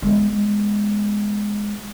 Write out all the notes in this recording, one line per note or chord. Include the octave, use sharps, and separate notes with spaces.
G#3 B3